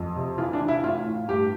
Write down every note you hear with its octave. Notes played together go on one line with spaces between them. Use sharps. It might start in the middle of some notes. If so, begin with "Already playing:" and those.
Already playing: F2
C3
E3 F4
D4
E3
E4
A2 F4
A2
G2 G4